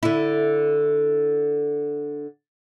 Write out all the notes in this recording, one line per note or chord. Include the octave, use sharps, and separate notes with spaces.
D3 E4